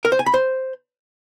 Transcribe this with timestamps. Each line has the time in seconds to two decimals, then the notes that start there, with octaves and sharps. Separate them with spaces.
0.05 A#4
0.12 C5
0.19 G#5
0.26 B5
0.34 C5